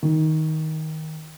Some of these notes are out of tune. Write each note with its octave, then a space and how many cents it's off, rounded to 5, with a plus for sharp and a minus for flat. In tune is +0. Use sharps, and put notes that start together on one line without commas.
D#3 +15